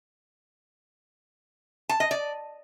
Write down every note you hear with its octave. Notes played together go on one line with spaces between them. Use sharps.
A5
D#5
D5